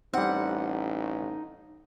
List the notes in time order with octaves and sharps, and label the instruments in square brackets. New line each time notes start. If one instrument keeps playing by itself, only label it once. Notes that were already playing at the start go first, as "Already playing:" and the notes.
[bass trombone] A1 [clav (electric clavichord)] G3 C4 [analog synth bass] D#4 [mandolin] F#5